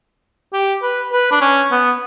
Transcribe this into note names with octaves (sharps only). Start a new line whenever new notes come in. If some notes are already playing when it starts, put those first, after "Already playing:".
G4
B4
B4
D4
C#4
B3